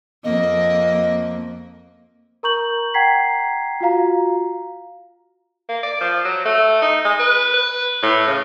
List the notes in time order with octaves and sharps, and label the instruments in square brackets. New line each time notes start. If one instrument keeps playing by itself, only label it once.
[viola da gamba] F2 A#3 [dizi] D#5
[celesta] A#4 A#5 C#6 G6 F#7
F#5 G5 A#5 G#6 B6 C7
F4 F#4 F5 A#5
[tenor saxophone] A#3
D5
F3
F#3
A3
D#4
G#3
B4
B4
A2
C#3